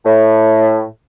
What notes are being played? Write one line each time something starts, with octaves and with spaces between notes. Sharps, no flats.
A2